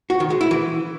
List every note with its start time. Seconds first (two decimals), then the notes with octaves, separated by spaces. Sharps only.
0.10 F#4
0.20 D#3
0.30 G#3
0.41 E4
0.51 E3